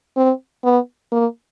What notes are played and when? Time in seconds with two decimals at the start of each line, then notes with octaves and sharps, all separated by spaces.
0.17 C4
0.65 B3
1.12 A#3